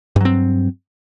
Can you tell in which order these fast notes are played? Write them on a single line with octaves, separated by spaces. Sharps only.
G2 F#3 C4